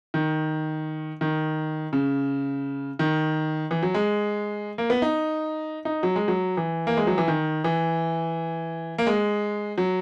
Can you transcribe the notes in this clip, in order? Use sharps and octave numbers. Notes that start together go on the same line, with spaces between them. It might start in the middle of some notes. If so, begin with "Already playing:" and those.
D#3
D#3
C#3
D#3
E3
F#3
G#3
A#3
B3
D#4
D#4
F#3
G#3
F#3
E3
A#3
G#3
F#3
E3
D#3
E3
A#3
G#3
F#3